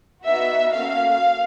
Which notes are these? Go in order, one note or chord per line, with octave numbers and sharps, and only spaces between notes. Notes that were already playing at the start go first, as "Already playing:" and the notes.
B3 D#4 F#4 E5
A#3 C#4 F#4 A4 F5